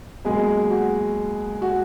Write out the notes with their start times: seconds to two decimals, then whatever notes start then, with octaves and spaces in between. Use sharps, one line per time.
0.25 C#2 B2 F#3 G#3 A#3 G#4
0.70 F#4
1.62 F#4